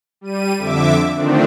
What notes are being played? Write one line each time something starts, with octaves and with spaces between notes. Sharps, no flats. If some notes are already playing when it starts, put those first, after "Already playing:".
G3 D#7
F2 D3 E5 D6
D3 D#3 F3 A3 C4 D4